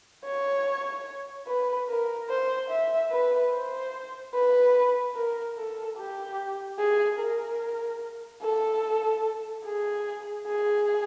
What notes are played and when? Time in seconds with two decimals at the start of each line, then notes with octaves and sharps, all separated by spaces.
0.25 C#5
1.47 B4
1.89 A#4
2.29 C5
2.70 E5
3.11 B4
3.52 C5
4.34 B4
5.15 A#4
5.57 A4
5.98 G4
6.79 G#4
7.19 A#4
8.42 A4
9.66 G#4
10.47 G#4